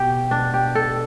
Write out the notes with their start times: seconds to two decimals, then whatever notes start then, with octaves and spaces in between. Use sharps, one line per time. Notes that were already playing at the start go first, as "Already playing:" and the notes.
Already playing: B2 G4
0.31 D4
0.54 G4
0.75 A4